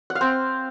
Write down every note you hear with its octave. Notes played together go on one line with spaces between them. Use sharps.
F#5
F5
C4